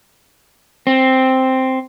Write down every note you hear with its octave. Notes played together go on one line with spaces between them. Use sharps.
C4